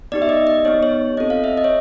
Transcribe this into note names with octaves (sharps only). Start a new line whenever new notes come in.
B3 D#4 G4 D5
E5
D#5
D#5
B3 D#4 G4 C#5
C#5
C4 F4 A4 D#5
F5
E5
D#5
C#5